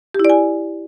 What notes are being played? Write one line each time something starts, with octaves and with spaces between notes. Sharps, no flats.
G4
E4
D5
G#5